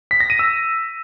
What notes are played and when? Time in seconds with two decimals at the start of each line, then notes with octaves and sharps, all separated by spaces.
0.11 B6
0.20 A#6
0.30 D#7
0.39 E6